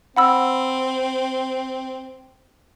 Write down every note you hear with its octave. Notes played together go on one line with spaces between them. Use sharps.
C4 F#5 B5 E6